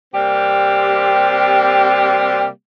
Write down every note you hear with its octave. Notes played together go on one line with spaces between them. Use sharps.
C3 G3 A#3 C4 G4